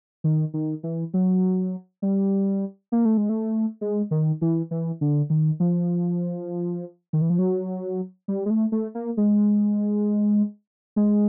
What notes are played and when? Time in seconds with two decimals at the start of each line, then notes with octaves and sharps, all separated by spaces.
0.24 D#3
0.54 D#3
0.83 E3
1.14 F#3
2.02 G3
2.92 A#3
3.05 A3
3.17 G#3
3.29 A3
3.81 G#3
4.11 D#3
4.41 E3
4.71 E3
5.01 D3
5.30 D#3
5.60 F3
7.13 D#3
7.21 E3
7.30 F3
7.39 F#3
8.28 G3
8.46 G#3
8.50 A3
8.72 A3
8.95 A#3
9.17 G#3
10.96 G#3